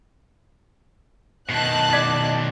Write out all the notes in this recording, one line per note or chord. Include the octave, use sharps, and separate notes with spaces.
B2 D#3 D#5 A5 F#6
D5 G#6 B6